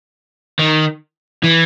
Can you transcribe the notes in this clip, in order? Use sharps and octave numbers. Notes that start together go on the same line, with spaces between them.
D#3
E3